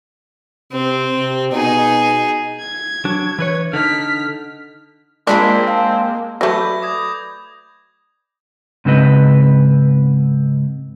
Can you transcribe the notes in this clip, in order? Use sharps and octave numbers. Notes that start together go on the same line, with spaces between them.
C3 C4
C3
B2 D#4 G#4
G#6
F#3 D4
E3 B4 C#5
D3 D#4 F6 B6
G#3 A#3 C4 D4 F4 B5 B6
F5 A5
F#3 A3 B4 D5 B5 G6 G#6 A#6
D6 D#6 G#6
G#2 C#3 C4 B4 D#5